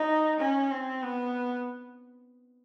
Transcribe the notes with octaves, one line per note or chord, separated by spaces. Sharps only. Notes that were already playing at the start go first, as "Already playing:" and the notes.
Already playing: D#4
C#4
C4
B3